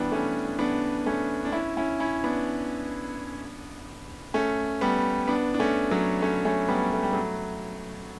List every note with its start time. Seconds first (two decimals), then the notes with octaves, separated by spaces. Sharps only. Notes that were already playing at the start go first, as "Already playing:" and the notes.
Already playing: E3 G3 B3 D4
0.12 A3 C#4
0.59 B3 D4
1.06 A3 C#4
1.45 D4
1.52 C#4 E4
1.77 C#4 E4
2.00 C#4 E4
2.24 B3 D4
4.34 A3 C#4
4.81 G3 B3
5.28 B3 D4
5.54 D4
5.60 A3 C#4
5.91 F#3 A3
6.22 A3 C#4
6.45 A3 C#4
6.68 G3 B3
6.93 A3
7.03 G3
7.13 F#3 A3